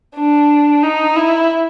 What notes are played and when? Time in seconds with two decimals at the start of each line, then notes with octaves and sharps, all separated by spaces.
0.16 D4
0.83 D#4
1.16 E4